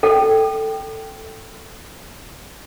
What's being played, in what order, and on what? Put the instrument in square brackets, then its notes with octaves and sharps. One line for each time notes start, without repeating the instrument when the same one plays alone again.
[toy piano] A4 G5